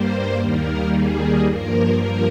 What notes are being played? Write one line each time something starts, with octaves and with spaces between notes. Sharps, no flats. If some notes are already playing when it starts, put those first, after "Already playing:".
Already playing: G2 G3 A#3 C5
D#2 D#3 G3 A#3 A#4
G#4
G2 F3 A#3 A#4
A#4